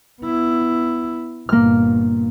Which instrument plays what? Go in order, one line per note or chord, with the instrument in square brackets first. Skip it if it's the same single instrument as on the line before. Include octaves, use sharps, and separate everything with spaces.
[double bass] B3 E4
[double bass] G1 A#2 [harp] A#3 F6